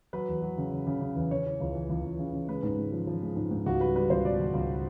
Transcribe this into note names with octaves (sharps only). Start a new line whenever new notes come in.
F#3 B4
E2
F#3
C#3
C#3
C#3
C#3
E2
C#3 C#5
E3
C#2
E3
C#2
C#2
C#3
C#3
G#3 B4
G#2
G#3
F3
F3
G#3
G#2
G#2
C#2 F#4
G3 B4
G3 B4
C#2 C5
B2 D5
C#2
C#2